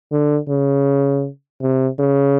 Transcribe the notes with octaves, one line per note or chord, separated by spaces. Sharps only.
D3
C#3
C3
C#3